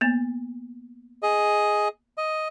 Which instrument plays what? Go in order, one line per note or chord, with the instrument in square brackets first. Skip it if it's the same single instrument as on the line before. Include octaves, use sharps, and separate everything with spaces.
[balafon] A#3 B3
[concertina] G#4 D#5
D#5